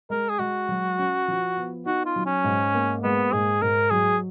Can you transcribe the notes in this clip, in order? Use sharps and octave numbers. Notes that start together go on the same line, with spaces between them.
G#3 A#4
G#4
G#3 F#4
F#3
C#4
F3
B3
D#4 F#4
F4
F#3
C#4
G#2
A#3
G#3 B3
G#2 G#4
G#2 A#4
F#3 G#4